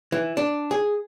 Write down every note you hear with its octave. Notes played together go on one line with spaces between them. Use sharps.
E3
D4
G#4